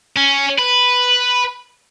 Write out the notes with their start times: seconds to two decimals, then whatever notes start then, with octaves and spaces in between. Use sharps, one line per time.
0.17 C#4
0.59 B4